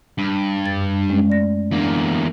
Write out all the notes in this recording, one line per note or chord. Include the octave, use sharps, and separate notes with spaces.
G2
F#2 A6
G#3 C#4
A3 D5 A#6
E2 A#3 D4